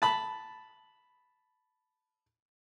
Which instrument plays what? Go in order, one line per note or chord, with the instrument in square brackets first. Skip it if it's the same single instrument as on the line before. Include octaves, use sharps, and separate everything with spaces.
[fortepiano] A5 B5